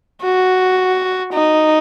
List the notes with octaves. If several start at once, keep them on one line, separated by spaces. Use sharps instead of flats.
F#4
D#4